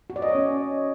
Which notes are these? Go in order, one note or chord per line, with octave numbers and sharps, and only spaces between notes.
F#4
D5
D#5
C#5
C#4